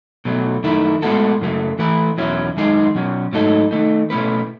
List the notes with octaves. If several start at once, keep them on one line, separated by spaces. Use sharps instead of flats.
B2 F#3 A3
F#2 D#3 A3 E4
A2 G#3 B3 F#4 A4
F#2 C#3 F#3 A3
E3 A3 E4 B4
E2 B2 F#3 C#4 E4
F#2 D#3 G#3 D#4 G#4
B2 F#3 C#4
G#2 F#3 A3 D#4 A4
D#3 A3 D#4
B2 A3 C#4 E4 B4